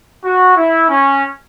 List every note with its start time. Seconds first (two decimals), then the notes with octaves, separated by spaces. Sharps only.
0.24 F#4
0.56 E4
0.89 C#4